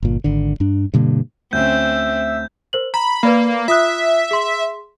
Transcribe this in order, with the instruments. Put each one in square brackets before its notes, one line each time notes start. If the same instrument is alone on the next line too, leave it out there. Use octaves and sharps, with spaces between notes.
[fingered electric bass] G1 A#2
G#1 D3
G2 D4
G2 B2 D3 A#3
[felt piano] D2 C#4 [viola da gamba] C4 [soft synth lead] E5 [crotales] G6
[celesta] A#4 C5 F#7
[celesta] A#5 [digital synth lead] B5
[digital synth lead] A#3 [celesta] B4 D5 B5
[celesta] F4 D#6 F#6 [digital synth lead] E5
[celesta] G#4 C6